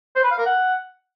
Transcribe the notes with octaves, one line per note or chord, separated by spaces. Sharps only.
C5
B4
F5
A#4
F#5